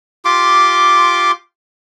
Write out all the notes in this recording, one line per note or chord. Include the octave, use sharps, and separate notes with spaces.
F4 G4 C6 D6